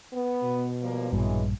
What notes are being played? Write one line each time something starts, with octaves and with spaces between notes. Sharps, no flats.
B3
B2
F3 G3 A#3
A#1 G2 E3 F#3 G#3